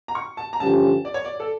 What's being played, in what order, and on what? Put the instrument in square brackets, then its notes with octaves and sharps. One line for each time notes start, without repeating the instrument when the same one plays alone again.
[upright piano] A#5
C#6
A5
A#5
[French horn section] G2 D3 F3 C#4 G4 [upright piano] A5
[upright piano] D5
C#5
D5
A4